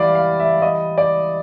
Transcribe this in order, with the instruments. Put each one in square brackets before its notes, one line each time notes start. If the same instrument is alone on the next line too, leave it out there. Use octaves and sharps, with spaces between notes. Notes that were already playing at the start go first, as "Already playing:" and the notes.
Already playing: [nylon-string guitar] E3 G3 [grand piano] D5 F5
[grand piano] F5
E5
D#5
D5